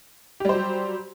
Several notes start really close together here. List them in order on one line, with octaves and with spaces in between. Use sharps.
G4 G3 C5 F#3